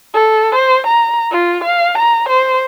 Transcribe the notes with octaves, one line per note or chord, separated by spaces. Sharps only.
A4
C5
A#5
F4
F5
A#5
C5